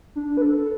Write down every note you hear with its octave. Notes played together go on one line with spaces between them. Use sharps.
D4
B4
A4